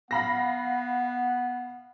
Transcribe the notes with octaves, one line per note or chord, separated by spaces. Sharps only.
B3 F5 F#5 B5 A#6